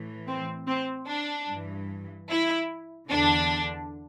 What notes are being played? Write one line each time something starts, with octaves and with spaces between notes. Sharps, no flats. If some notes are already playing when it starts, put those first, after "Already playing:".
Already playing: A2 E3
C4
C4
D4
G2 E3
E4
E2 D3 D4